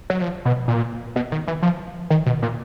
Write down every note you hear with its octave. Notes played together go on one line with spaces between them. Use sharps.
F#3
F3
B2
A#2
B2
D#3
E3
F3
D#3
B2
A#2